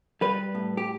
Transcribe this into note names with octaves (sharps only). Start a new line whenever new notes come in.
G3 B4
A2
G4